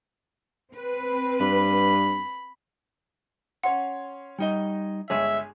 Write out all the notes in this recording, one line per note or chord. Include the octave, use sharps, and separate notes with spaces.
C4 B4
G2 B5
C#4 C#5 F#5 C6
G3 D#4 D#5
G1 G#3 G#4 C#5 E5